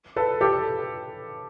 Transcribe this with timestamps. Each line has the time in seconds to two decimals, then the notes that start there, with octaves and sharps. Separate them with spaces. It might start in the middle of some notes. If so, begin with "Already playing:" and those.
0.16 A4 B4
0.41 G4 A4